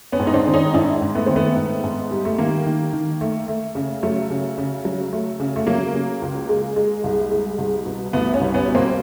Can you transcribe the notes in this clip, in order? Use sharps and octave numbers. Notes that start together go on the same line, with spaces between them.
B3 C#4
G#2
D#4
C4 D4
D#3
C#4 D#4
G#2 D4 E4
G#2
A3 B3
D#3 C4
A3 B3
G#2
G#2
G3
A3
D#3 A#3
D#3
D#3
A3
A3
C#3
F#3 A3
C#3
C#3
F#3
A3
C#3
A3
F#3 A#3
C#3
C#2
G#3
G#3
C2
G#3
C2
B2
C2 A3 B3
B3 C#4
C2
B3 C#4
B2
A#3 C4